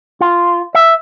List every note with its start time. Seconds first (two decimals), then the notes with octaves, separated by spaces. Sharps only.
0.21 F4
0.75 E5